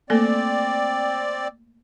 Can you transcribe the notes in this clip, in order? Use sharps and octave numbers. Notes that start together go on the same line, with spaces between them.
A3 A#3 C4 A4 D5